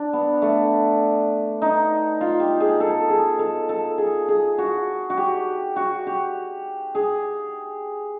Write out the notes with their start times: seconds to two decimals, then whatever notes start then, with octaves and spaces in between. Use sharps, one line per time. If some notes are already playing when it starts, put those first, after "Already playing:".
Already playing: D4
0.13 B3
0.42 A3
1.62 D#4
2.21 F4
2.40 G4
2.60 G#4
2.80 A4
3.10 G#4
3.39 A4
3.69 A4
3.98 G#4
4.28 G#4
4.58 F#4
5.10 F#4
5.17 G4
5.76 F#4
6.07 G4
6.95 G#4